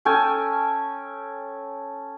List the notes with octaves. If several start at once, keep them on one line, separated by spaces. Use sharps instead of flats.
C#4 A4 G5 G#5